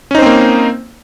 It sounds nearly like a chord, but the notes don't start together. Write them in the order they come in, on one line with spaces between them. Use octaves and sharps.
C#4 D#4 C5 C4 A#3